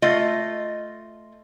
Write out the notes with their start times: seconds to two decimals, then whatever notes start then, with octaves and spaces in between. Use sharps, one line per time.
0.02 A3 F4 D#5